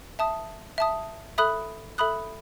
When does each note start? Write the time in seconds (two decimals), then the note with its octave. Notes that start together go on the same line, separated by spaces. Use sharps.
0.19 E5 A5 D#6
0.78 E5 A5 D#6
1.38 A4 E5 B5 D#6 F#6
1.98 A4 E5 B5 D#6 F#6